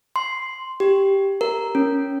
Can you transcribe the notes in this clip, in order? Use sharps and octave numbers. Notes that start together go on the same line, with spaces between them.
C6
G4
A#4
C#4